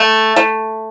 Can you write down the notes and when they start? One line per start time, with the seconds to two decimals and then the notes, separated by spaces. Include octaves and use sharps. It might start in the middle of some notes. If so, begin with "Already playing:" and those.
Already playing: A3
0.36 A3